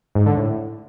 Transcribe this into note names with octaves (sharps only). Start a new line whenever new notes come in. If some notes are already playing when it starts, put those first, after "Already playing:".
G#2
D3
A2